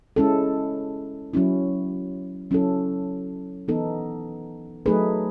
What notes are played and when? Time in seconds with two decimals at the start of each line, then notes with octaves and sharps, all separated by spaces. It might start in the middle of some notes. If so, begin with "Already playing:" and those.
0.16 G#3 C#4 E4 A4
1.34 F#3 C#4 E4
2.51 F#3 C#4 E4 A4
3.68 E3 B3 D#4 A4
4.86 F#3 A3 D#4 G#4 B4